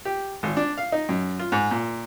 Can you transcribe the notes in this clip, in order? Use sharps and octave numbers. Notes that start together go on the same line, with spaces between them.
G4
G#1
D4
F5
D#4
F#2
F4
G#2
A#2